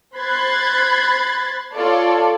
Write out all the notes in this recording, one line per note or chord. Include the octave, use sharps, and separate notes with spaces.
C5 B5 F#6 G#6 A6 C7
F4 A4 C#5 D5 A5